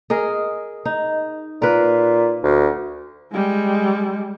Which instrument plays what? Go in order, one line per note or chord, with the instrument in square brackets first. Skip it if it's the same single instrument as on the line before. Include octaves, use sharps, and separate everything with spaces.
[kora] G#4 A#4 D#5
D#4
[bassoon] A#2 [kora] A#4 B4
[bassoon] D2
[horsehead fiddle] G3 G#3